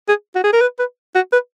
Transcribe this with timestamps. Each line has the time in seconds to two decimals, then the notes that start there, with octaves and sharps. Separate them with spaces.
0.08 G#4
0.35 F#4
0.44 G#4
0.53 A#4
0.61 B4
0.79 B4
1.15 F#4
1.33 B4